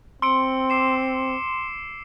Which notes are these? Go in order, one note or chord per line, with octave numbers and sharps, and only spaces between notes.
C4 C6 E6 C#7 D7
D6 C7 E7